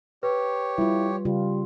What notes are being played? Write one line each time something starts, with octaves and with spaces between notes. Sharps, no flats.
G4 B4 C#5
G3 E4 F4
C#3 G3 F4